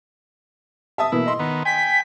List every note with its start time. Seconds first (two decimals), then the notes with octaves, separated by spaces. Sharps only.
0.98 E5 A5 D#6
1.12 B2 E3 A#3 E4
1.26 D#5 C6
1.39 D#3 B3
1.65 G5 G#5 B6